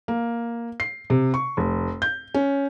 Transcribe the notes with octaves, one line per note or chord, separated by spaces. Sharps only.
A#3
C7
C3
C#6
F1
G6
C#4